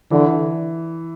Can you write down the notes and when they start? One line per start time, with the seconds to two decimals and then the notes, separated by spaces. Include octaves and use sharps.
0.11 D3 E3